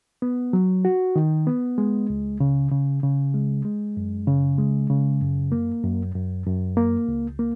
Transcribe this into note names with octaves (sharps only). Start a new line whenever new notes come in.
B3
F#3
F#4
D#3
B3
G#3
C#2
C#3
C#3
C#3
G#3
G#3
F#2
C#3
G#3
C#3
F#2
A#3
F#2
F#2
F#2
A#3
C#2
A#3